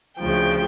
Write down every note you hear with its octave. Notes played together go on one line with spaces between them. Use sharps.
D2 C#3 F3 G5